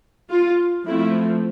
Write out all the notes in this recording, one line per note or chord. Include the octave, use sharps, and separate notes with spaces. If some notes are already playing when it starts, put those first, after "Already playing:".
F4
F3 A3 C4 E4